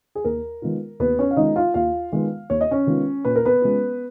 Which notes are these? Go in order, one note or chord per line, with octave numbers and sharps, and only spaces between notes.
G#4
D#2 A#4
D#3 G#3 B3 F4
D#2 B3 B4
C#4 C#5
F5
D#3 G#3 B3 D#4 F4 D#5
F4 F5
D#2 F4 F5
D#3 G#3 B3 F4
D#2 C#5
D#5
C#4 C#5
D#3 G#3 B3 F4
A#2 B4
A#4
B3 B4
G#3 C#4 F4